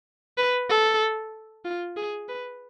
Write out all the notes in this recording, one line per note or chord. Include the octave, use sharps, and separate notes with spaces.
B4
A4
F4
G#4
B4